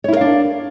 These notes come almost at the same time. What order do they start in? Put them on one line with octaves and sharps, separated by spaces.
C#5 E4 A#4 F5 D4